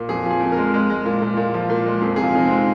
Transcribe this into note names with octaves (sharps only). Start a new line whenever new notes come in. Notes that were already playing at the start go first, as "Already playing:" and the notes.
Already playing: A#2
F2 G#4
F3
G#4
F2
A#4
G#3
G#3
G#3
A#2
A#2
A#2
F3
A#2
G#3
F2 G#4
C3 G#4
F4
F2 D#4
G#3 C4